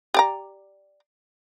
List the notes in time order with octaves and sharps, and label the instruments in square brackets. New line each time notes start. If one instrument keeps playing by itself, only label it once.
[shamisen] G4 D5 A#5